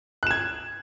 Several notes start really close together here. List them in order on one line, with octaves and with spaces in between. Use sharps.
F#6 E7 G#6